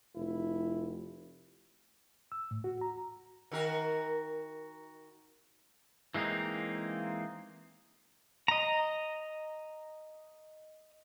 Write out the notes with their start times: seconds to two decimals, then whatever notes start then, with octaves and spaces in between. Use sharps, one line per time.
0.16 F1 E4
2.32 E6
2.51 A2
2.64 F#4
2.81 A#5
3.51 D#3 F#4 A#4
6.14 E3 G#3 A#3 C4 D#4
8.48 D#5 A#5